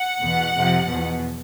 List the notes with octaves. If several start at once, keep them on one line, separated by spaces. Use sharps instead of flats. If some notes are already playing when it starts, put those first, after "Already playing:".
Already playing: F#5
E2 B2
F2 C3 F3
E2 B2